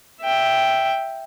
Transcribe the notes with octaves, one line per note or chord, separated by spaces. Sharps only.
E5 G5